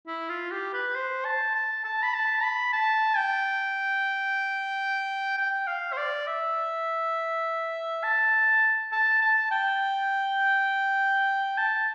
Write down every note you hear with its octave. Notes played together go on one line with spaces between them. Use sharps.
E4
F4
G4
B4
C5
A5
A5
A5
B5
A5
B5
A5
G5
G5
F5
C5
D5
E5
A5
A5
A5
G5
A5